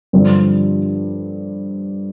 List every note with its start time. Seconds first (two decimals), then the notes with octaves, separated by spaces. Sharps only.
0.13 G2 D3 F3 C4